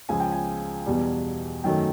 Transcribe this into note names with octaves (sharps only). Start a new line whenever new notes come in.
C#2 C#3 F3 G#5
G5
G#5
E2 B2 G3
F#2 D#3 F#3 A3 G5